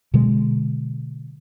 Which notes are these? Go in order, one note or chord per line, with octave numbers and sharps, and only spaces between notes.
B2 D3 F#3 G#3